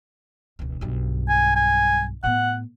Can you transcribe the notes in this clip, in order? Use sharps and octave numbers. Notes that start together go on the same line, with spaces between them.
E1 C#2
B1 G2
G#5
G#5
A2 B3 F#5